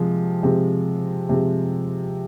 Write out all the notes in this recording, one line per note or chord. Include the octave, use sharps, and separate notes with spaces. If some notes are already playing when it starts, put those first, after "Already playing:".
Already playing: C3 F3 G#3
C3 F3 G#3
C3 F3 G#3